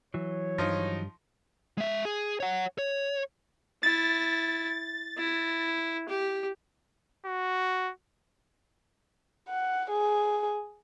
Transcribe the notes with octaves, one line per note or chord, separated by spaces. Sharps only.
E3 F#3 C#5
G2 F3 D#4
G#3 E5
G#4
C#5 F#5
C#5
E4 A6
E4
G4
F#4
F#5
G#4